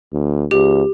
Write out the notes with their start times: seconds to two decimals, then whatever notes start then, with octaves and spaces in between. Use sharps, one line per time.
0.13 D2
0.51 C#2 G4